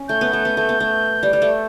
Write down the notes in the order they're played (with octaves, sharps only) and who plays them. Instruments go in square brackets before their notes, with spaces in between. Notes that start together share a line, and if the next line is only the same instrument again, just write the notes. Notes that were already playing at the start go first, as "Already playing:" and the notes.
Already playing: [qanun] C#4
[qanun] A3 [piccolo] G6
[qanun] B3
A3
B3
A3
B3
A3
G3
G3
A3